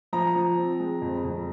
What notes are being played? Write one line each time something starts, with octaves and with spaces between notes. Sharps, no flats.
F3 A#5
F3
C4
G#3
F2
F2